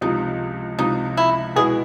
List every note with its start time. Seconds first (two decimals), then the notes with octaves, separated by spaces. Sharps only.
0.01 C#2 C3 F3 D#4
0.79 C#2 C3 F3 D#4
1.17 E4
1.56 B2 G#3 B3 E4 G#4